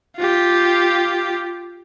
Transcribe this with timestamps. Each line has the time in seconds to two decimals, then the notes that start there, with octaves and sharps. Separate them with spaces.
0.16 F4 G4